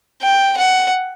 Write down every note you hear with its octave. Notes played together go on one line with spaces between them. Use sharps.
G5
F#5